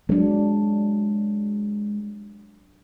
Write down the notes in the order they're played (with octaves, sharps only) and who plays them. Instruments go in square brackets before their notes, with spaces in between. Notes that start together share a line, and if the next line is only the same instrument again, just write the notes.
[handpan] F#3 D4 [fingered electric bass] G#3